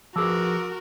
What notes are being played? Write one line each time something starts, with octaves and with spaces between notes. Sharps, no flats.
F3 F#4 G#4 A#4 B4 A5 D6 E6